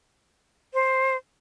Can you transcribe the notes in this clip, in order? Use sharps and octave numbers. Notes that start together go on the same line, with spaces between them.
C5